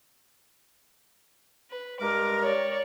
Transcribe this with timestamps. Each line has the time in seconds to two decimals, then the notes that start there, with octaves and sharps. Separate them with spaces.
1.70 B4
2.00 G2 G#3 A#4 D6
2.42 C#5 D5